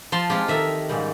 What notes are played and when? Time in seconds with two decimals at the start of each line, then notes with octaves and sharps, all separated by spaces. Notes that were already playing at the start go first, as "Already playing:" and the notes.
0.12 F3 A5 C6
0.30 G#3 C4 D#4 F4 G4
0.48 D#3 A4 A#4 E5
0.89 G#2 C#3 G3